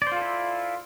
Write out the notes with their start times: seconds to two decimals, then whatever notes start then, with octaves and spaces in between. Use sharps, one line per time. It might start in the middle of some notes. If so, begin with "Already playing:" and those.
0.02 D5
0.07 C5
0.12 F4
0.17 A4
0.22 E4